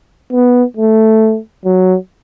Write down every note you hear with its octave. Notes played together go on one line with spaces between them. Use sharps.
B3
A3
F#3